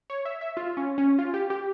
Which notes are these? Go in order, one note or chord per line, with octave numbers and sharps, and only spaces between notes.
C#5
E5
E5
F4
C#4
C#4
F4
G4
G4